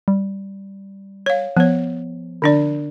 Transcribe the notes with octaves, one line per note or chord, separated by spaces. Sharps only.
G3
C#5 F5
F3 B3 C#5
D3 D4 D5